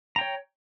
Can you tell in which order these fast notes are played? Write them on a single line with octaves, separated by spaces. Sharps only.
A#5 G5 C#5